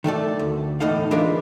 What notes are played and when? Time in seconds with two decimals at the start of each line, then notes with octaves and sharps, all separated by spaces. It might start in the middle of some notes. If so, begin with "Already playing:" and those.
0.04 D#3 A3 A4 D5
0.39 D2
0.80 E2 A2 D#4 A4 F5
1.11 E3 G#3 D4 F4 A#4 B4